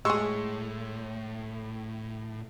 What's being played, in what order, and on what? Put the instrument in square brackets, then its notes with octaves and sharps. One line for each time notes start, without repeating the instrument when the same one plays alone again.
[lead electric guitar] A2 [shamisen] G#3 G#4 [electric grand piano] C6 C#6 E6